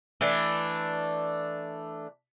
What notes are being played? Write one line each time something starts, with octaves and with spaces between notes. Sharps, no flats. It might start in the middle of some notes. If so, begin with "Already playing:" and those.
E3 A3 D4